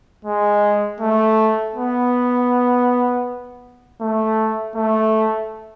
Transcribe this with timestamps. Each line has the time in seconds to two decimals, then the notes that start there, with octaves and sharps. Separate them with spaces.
0.25 G#3
1.00 A3
1.75 B3
4.01 A3
4.75 A3